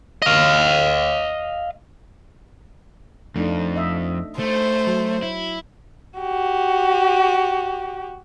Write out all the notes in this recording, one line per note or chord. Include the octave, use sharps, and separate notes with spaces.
D#5 F5
F2 A3 D4 D#4
D#5 E5
A3 C5
F#3
E4
F#4 G4